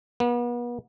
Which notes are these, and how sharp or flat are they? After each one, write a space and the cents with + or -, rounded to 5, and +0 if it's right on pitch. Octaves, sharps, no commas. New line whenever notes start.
B3 -40